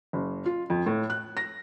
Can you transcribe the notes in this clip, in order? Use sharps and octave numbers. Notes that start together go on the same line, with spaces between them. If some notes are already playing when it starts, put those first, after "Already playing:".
F#1
F4
F2
A2
F#6
A#6